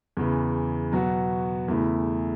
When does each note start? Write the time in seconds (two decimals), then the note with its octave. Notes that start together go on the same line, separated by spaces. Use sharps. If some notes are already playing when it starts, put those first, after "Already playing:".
0.17 E2 C#3 E3
0.92 B2 F#3 B3 F#4
1.68 E2 C#3 A3 E4